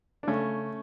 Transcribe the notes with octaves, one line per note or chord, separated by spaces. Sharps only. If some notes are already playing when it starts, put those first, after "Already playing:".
D4
C#3 A3 C#4